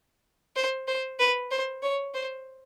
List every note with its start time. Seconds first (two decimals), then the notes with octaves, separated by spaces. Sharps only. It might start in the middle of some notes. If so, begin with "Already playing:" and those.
0.56 C5
0.87 C5
1.19 B4
1.51 C5
1.83 C#5
2.14 C5